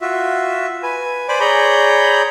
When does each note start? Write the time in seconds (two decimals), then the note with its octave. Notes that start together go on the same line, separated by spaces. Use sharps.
0.01 F4 F#4 E5
0.83 B4 G#5
1.29 B4 C5 D5 G#5 B5 D6
1.40 G#4 C#5 D5 A#5 B5 G6